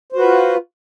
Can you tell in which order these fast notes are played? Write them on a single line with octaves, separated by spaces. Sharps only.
C5 F#4 B4 F4